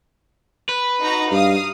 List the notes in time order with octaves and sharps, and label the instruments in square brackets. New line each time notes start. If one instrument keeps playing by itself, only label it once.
[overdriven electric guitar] B4
[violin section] D#4 F#4 A#5
[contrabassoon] G2 [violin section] F5 D#6